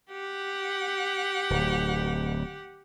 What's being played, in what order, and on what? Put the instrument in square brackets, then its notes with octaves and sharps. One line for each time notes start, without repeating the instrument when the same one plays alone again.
[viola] G4 F#5
[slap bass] D1